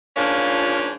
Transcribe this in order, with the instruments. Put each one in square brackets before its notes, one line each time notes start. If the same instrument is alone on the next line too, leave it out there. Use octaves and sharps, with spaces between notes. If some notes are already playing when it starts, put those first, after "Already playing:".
[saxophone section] G#2 F3 A#3 C#4 D4 F4